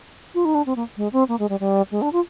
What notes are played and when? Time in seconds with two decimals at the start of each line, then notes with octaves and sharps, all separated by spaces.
0.34 F4
0.45 D#4
0.55 D4
0.66 C4
0.76 A#3
0.97 G#3
1.13 C4
1.28 A#3
1.39 G#3
1.49 G3
1.60 G3
1.91 G#3
2.02 D4
2.12 F4